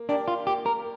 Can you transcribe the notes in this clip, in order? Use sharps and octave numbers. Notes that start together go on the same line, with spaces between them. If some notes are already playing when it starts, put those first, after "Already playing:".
Already playing: A#3
D4 G4 A#4 D5
F4
A#3 G4
A#4